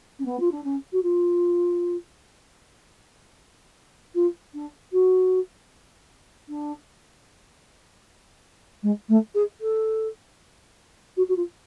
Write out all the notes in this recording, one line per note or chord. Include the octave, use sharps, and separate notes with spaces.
C#4
B3
F4
D4
C#4
F#4
F4
F4
D4
F#4
D4
G#3
A3
G#4
A4
F#4
F#4
F4